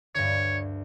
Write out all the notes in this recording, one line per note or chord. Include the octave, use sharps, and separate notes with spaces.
D2 G2 C#5